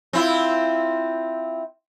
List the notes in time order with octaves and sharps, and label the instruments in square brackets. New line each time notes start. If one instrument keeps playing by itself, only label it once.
[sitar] C4 E4 F4